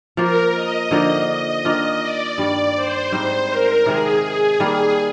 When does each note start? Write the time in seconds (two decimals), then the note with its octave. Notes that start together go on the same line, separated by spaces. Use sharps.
0.17 F3 A#3 F4 A#4
0.54 D#5
0.91 D3 F3 A#3 D#4
1.28 D#5
1.65 D#3 A#3 D4 F4
2.01 D5
2.38 G2 D#3 G3
2.75 C5
3.12 G#2 G3 C4 D#4
3.49 A#4
3.86 C3 D#3 G#3 G#4
4.23 G#4
4.60 D#3 G3 A#3